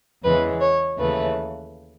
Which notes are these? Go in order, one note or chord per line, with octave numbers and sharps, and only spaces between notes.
E2 C#3 E3 G#3 B4
C#5
D#2 C#3 E3 A3 B4